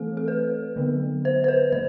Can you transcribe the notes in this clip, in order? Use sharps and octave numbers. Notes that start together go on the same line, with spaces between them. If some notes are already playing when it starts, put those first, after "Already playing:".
Already playing: E3 A3 C4 A4
A4
B4
D3 F#3 B3
C5
C5
B4
F#3 C5